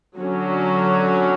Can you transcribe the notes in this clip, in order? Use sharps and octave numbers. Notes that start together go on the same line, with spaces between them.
D3 F#3 C#4